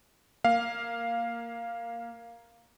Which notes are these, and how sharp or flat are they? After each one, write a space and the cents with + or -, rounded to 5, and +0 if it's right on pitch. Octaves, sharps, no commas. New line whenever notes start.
A#3 +0 F5 +0